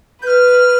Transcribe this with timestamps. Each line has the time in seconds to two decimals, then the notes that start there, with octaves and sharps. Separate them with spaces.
0.22 B4 G6
0.27 F6